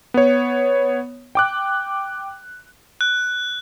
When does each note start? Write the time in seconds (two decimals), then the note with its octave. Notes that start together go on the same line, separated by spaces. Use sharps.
0.14 B3 C#5
1.35 G5 D6 F#6
3.01 F#6